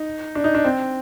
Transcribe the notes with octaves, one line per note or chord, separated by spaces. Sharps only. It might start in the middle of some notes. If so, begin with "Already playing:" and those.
Already playing: D#4
D4
D#4
D4
C4